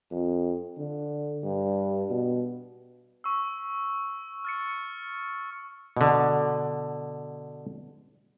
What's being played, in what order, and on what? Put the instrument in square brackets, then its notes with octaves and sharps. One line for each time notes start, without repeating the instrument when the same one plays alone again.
[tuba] F2
D3
G2
B2
[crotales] C#6 E6
F6 A6 C#7
[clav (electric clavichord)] B2 D3